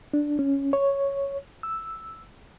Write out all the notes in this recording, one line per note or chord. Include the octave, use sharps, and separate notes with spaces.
D4
C#4
C#5
E6